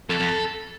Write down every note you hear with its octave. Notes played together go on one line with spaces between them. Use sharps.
F2 A4
F2